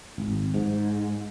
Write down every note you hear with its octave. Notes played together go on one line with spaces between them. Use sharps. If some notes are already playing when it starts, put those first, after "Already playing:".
G#1
G#2